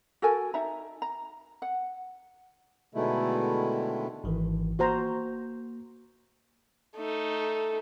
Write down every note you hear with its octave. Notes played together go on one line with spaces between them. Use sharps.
F#4 A4 A#4 G#5
D#4 E5 A#5
A#5
F#5
B2 D3 D#3 G#3 A3 E4
G#1 D#3 E3
A#3 F#4 C5 A#5
A3 D#4